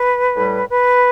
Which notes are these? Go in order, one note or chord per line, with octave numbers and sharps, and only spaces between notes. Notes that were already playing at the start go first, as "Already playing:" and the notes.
Already playing: B4
A2 G3
B4